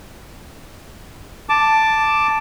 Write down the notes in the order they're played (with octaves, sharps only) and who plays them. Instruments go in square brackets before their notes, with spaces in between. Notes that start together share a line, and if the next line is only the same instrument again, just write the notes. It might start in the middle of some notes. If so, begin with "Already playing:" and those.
[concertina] A5 D6